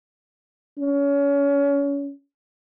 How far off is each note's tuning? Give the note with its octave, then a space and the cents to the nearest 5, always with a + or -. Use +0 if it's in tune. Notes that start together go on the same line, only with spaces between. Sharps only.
C#4 +30